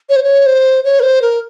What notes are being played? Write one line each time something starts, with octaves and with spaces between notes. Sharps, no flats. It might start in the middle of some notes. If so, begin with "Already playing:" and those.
C#5
C5
C#5
C5
C#5
A#4
C5
A#4